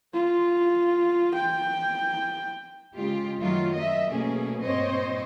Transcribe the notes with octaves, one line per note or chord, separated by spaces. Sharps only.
F4
G5
C#3 G#3 F4 G4
F#2 D#3 F#3 A3 F4
D#5 E5
B2 A3 A#3 C#4 G#4
G2 A#2 C4 C5 C#5 D#5